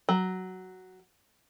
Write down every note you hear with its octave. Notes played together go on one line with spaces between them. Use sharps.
F#3